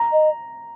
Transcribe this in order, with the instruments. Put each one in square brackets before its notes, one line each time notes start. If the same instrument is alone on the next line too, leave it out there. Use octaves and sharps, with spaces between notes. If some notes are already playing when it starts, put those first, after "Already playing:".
Already playing: [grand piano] A#5
[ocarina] D#5